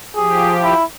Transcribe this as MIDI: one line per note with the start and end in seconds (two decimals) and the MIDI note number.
0.16 0.74 53
0.16 0.74 67
0.16 0.54 68
0.63 0.83 64